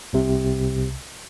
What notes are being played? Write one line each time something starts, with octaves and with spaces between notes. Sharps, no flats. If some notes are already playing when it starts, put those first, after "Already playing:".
C2 C3